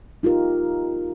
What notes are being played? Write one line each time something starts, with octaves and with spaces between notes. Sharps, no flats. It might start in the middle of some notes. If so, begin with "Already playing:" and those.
D#4 F4 G4 A#4